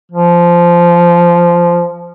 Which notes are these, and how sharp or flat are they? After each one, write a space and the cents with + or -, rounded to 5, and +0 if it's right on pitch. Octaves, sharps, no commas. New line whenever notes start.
F3 -10